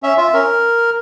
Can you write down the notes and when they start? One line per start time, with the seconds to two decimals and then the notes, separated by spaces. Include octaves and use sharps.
0.03 C#4 E5
0.18 F4 E5
0.33 C#4 A#4